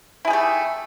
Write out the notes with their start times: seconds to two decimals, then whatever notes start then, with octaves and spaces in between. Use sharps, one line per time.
0.25 E4
0.28 G#4
0.30 G4
0.33 A3